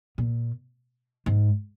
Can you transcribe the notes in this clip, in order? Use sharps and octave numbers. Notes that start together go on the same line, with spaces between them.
A#2
G#2